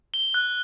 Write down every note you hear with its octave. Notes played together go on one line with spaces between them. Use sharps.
G7
F#6